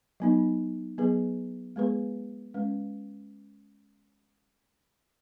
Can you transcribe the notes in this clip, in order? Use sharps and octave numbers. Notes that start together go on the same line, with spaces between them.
F#3 B3 D#4
F#3 B3 G#4 B4
G#3 B3 G#4 B4
G#3 C#4 B4